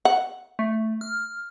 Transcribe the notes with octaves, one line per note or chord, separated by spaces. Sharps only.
F#5
A3
F6